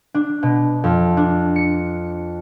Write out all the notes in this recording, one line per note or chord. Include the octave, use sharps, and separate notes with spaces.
D4
B2
F2
D4
C#7